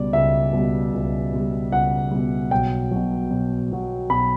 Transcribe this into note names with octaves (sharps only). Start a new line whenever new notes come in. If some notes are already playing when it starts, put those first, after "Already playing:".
Already playing: C#2 B2 G3 D5
C#2 E5
B2 G3
C#2
B2 G3
C#2 F#5
B2 G3
B1 G5
B2 F#3
B1
B2 F#3
B1 B5